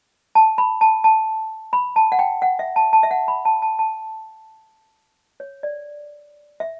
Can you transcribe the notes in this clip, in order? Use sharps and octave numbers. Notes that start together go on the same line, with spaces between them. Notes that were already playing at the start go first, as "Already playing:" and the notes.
A5
B5
A5
A5
B5
A5
F#5
G5
F#5
E5
A5
A5
E5
F#5
B5
A5
A5
A5
C#5
D5
E5